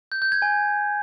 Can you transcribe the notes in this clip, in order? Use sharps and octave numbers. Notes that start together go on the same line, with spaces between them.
G6
G6
G#6
G#5